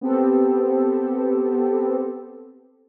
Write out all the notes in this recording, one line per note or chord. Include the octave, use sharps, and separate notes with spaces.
B3 C4 G4 A4